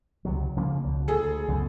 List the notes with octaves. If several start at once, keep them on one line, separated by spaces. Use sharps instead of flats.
C#2 C3 F#3
C#3 F3 A#3
C#2 B2
D2 G#4 A4
C#2 F#2 B2